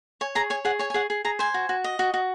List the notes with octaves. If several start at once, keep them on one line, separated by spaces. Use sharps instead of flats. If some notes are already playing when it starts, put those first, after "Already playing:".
C#5 G#5
G#4 A#5
C#5 G#5
G#4 F#5
C#5 G#5
G#5
G#4 F#5
G#4
G#4 A#5
C5 G#5
F#4
F#4
D#5
F#4
F#4